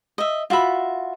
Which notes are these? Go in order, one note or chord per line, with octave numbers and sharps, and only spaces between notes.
D#5 E5
F4 F#4 E5 B5